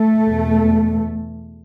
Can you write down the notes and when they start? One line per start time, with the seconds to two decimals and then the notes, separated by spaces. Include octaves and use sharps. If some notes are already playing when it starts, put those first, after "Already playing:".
Already playing: A3
0.26 E2 B2